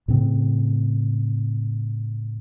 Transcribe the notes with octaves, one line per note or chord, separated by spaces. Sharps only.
A2 C#3 C4